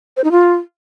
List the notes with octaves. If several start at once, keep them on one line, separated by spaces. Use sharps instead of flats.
C5
D#4
F4